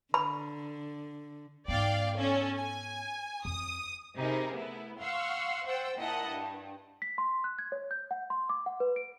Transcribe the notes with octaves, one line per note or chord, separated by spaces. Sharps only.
D3 B5
G#2 B3 D5 F5 G5
C#4 A4
G#5
F2 D#6
C3 D#4 E4 G#4 A#4
A3 B3 E4
F5 F#5 C6 C#6 E6 F6
C5 F#5 G5 E6 A6
A#2 E4 D#5 F#5 A5
G2
B6
C6
F#6
G#6
C#5
G6
F#5
C6
D6
F#5
B4
D7